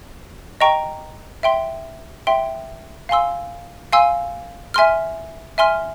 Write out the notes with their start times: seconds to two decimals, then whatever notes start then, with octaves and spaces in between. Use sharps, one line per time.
0.60 D#5 G5 A#5 C#6
1.43 E5 G5 C6
2.27 E5 G5 C6
3.09 F5 G#5 C6 E6
3.93 F5 G#5 C6 E6
4.74 E5 G#5 C6 F6
5.58 E5 G#5 C6 F6